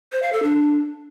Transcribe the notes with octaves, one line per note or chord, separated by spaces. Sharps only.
C5
F5
A4
D4